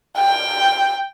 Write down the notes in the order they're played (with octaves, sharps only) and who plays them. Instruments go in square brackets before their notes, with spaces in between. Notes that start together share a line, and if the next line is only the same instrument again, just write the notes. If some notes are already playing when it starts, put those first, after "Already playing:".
[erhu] G5